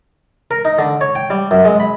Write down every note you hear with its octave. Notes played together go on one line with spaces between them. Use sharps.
A#4
D#4
D3
C#5
G5
G3
F#2
G#3
B5